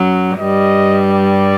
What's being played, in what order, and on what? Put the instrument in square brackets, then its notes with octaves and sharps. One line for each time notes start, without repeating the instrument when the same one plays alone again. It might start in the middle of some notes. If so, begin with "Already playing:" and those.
Already playing: [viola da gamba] F#2 F#3
[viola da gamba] G2 G3 [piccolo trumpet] D#5
[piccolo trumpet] D5